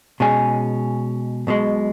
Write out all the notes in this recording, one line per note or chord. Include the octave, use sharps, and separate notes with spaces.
B2 G#3 C#4 G#4
B1 B2 G#3